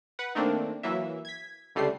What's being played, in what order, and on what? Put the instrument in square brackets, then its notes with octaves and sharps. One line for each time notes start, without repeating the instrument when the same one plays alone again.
[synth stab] B4 F#5
D#3 A3 A#3 C4 D4
E3 F#3 A#3 E5
G#6 B6
C#2 D3 G3 A3 C7